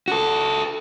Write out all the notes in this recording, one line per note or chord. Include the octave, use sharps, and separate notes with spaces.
F#4 A4